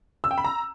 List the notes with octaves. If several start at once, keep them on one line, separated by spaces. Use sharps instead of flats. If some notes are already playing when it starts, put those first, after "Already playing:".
E6
G5
B5
A#5